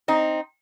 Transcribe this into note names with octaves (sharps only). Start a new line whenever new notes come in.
C4 D#4